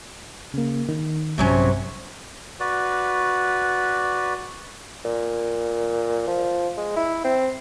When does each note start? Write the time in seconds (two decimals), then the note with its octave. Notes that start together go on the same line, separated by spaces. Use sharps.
0.54 C#3 A#3
0.89 D#3
1.38 A#1 G2 C3 F#3 C#4
2.60 F#4 B4 D5
5.05 A#2
6.27 F3
6.77 G#3
6.96 E4
7.24 C4